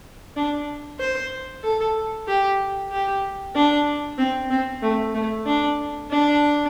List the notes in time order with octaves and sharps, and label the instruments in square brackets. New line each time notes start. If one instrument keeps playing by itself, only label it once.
[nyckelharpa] D4
C5
A4
G4
G4
D4
C4
C4
A3
A3
D4
D4